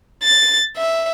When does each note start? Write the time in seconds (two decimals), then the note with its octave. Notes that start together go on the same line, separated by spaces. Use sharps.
0.23 A6
0.77 E5